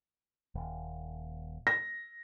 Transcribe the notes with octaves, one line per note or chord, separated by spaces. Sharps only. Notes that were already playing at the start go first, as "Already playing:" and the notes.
D#1
A#6